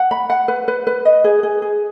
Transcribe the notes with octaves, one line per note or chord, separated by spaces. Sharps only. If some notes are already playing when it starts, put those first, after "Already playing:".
Already playing: F#5
B5
F#5
B4
B4
B4
D#5
G#4
G#4
G#4